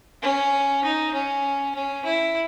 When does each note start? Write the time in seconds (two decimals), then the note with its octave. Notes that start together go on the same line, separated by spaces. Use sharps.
0.22 C#4
0.83 D#4
1.14 C#4
1.75 C#4
2.05 E4